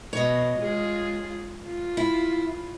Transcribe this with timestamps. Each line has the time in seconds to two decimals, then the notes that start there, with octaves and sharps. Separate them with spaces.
0.13 B2 C#5 D#5
0.58 G#3 F4 G#4
1.65 F4
1.97 E4